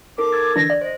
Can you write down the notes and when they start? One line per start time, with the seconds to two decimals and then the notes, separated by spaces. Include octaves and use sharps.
0.18 D#4 A4 A#4 D6
0.33 E6 G#6 A6
0.56 D3 E3 D4 A#6
0.70 D5
0.81 C5 D#5